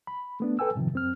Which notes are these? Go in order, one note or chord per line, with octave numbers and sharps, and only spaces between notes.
B5
A3 B3 D4
A4 B4 G5 G#5 E6
F#2 A2 C3 D#3 F3
F#2 C4 F6